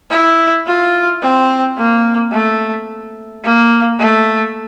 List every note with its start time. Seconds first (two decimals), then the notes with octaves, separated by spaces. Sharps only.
0.10 E4
0.67 F4
1.22 C4
1.77 A#3
2.32 A3
3.44 A#3
3.99 A3